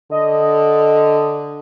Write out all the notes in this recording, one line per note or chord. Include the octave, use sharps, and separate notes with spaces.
D3 D#5